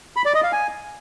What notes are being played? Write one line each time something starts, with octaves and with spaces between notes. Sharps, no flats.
B5
D5
D#5
F5
G#5